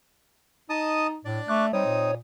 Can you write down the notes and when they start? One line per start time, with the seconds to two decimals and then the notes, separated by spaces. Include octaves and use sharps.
0.70 D#4 D#5 A5 D#6
1.25 A2 D4 D5
1.48 A3 C#6 D6 F#6
1.73 G3 C4 D#4 C#5 D#6
1.86 A#2